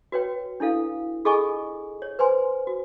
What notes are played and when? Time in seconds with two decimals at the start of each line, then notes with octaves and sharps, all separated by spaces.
0.12 F#4 B4 C#5 G5
0.60 D4 E4 A4 F5
1.25 F4 G#4 A4 D#5 G#5 C#6
2.02 C#5
2.19 B4 C5 G#5 C6
2.67 F#4